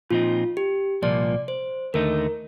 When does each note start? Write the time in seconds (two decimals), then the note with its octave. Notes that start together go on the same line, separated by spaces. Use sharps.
0.11 A#2 F3 C4 D#4 F4
0.57 G4
1.02 C2 A#2 F3 A#3 D5
1.48 C5
1.94 D#2 D3 A3 D#4 A#4